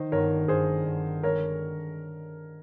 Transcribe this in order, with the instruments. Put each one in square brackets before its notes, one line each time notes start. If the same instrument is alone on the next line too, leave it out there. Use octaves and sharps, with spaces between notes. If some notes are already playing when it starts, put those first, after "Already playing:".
Already playing: [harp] D#3 [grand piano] C5 D#5
[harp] G1 [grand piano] A#4 C#5
[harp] G1 [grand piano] G#4 C5
[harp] G1
[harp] G#3 [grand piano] A#4 C#5